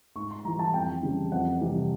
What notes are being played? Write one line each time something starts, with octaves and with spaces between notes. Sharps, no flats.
G#2 C#6
C6
E3 G3 A#5
A5
F2 G5
C#3 E3 G3
F2 F#5
C3 E3 G3